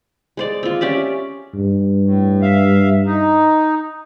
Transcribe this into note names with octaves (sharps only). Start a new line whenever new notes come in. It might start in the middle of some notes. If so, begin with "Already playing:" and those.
G#3 C5 D5
C4 F4
C#4 G4 D5 E5
G2
A2
E5 F5
D#4